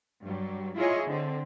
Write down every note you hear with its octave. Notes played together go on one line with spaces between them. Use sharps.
G2 F#3 G3
E4 F4 G#4 C#5 D#5
D3 C4